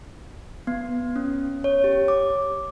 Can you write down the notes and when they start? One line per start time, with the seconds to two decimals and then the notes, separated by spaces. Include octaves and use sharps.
0.67 B3
1.16 C#4
1.64 C#5
1.84 G4
2.08 D6